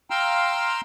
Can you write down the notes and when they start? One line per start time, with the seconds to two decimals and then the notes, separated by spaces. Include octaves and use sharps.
0.10 F5 G5 A#5 C6 E6 F6